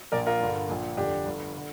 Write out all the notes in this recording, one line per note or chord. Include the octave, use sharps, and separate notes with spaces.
A#1 A#2 A#4 D5
F4 A#4
G1 G2 D3
A#1 A#2
F1 F2 D3 D4 G4
G1 G2 D3
D3